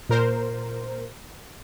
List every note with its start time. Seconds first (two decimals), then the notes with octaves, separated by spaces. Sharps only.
0.09 A#2 A#4 C5